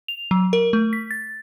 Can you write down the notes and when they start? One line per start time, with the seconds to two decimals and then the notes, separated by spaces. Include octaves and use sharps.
0.08 F7
0.31 F#3
0.53 A#4
0.73 A3
0.93 B6
1.11 A6